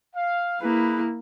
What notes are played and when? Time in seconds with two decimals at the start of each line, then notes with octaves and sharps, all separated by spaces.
0.15 F5
0.61 A#3 E4 G#4 B4